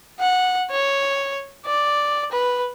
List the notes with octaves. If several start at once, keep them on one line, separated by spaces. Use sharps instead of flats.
F#5
C#5
D5
B4